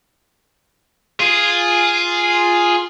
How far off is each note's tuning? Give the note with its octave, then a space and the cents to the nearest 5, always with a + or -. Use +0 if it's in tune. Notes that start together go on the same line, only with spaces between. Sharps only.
F4 +0 G#4 +0